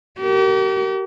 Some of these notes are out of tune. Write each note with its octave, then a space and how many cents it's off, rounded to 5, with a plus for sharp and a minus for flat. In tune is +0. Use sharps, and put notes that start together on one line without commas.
G4 -40 A#4 -20